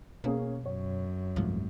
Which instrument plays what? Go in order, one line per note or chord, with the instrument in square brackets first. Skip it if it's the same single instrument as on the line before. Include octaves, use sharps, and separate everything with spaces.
[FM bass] B2 [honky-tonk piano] A#3 C#4 G#4
[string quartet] F#2 [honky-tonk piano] C#5
[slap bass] C2 G#2 A3 [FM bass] F3